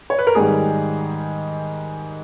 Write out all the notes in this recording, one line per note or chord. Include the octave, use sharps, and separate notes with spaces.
C#5
B4
A#4
G#2 D#3 G3 G#4